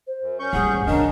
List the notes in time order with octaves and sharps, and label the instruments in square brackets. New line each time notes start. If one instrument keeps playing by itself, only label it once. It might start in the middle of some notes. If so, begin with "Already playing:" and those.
[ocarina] C5
[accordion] F#2
C#4 C#6 G6
[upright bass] A1 G2 [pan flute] G#4 [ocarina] F#5
[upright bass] C2 D#3 [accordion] C#4 A#4 F5 [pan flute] D4 [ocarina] D#5